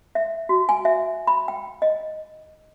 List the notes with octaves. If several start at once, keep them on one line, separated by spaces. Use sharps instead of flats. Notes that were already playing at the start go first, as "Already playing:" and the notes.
E5
F#4
G#5
E5
B5
G5
D#5